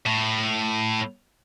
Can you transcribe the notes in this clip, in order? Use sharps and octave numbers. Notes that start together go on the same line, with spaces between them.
A2